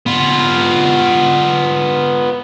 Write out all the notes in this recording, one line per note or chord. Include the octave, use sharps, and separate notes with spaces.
B3 F4